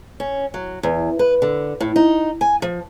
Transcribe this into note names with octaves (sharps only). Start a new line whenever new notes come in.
C#4
F#3
E2
B4
D3
A2
D#4
G#5
F3